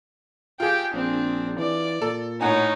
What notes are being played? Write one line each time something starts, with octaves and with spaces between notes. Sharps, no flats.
F4 G4 G#4 G5
A#1 C4 D4
E3 D5
A#2 A4
A2 D#4 C#5 F#5 G#5